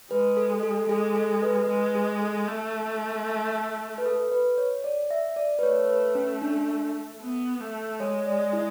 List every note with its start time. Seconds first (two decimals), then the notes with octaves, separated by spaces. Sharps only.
0.11 G#3 B4
0.37 A4
0.63 A4
0.85 A4
0.89 G#3 G#4
1.16 A4
1.42 B4
1.69 G#3 B4
1.95 G#4
2.21 A4
2.48 A3
3.98 B4
4.06 A4
4.32 B4
4.58 C#5
4.84 D5
5.11 E5
5.36 D5
5.59 B4
5.63 A3 C#5
5.89 B4
6.15 C#4
6.42 D4
7.21 B3
7.60 A3
8.00 G#3 C#5
8.26 D5
8.53 E4